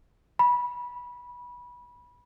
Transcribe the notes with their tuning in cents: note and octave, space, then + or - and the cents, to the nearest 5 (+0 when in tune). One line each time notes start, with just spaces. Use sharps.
B5 -20